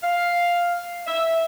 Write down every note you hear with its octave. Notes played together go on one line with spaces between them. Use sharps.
F5
E5